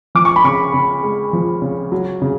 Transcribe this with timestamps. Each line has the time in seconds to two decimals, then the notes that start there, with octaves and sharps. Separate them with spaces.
0.15 F3 D6
0.25 C#6
0.36 B5
0.44 C#3 C#6
0.74 C#3
1.03 G#3
1.33 F3
1.62 C#3
1.92 F#3
2.22 C#3